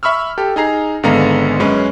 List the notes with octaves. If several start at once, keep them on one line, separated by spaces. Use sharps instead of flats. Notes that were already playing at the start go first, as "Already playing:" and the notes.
E5 B5 C#6 E6 F6
G4 A4
D#4 G#4 A#5 C7
G#1 D3 G#3 B3 F5 A#5
F#2 G#3 C#4 B4